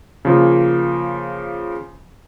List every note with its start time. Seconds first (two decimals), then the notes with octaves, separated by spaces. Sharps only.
0.25 C#3 F3 A#3